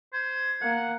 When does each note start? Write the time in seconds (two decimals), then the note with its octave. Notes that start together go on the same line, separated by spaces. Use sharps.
0.13 C5 G#6
0.61 A#3 F#5